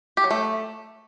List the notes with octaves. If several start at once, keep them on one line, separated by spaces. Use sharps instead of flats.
G4
F#3
A3